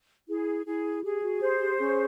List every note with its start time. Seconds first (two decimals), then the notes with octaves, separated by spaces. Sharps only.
0.28 E4 G#4
0.66 E4 G#4
1.04 G4 G#4
1.23 F#4
1.41 G4 C5
1.60 G4
1.79 C#4 G#4